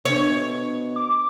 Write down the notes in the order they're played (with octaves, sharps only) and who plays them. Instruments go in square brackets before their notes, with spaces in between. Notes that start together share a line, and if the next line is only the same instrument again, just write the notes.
[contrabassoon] B2 [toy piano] D4 A4 [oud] C#5
[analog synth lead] D6